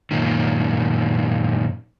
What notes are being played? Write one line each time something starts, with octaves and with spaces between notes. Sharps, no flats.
F#2 A#2 D#3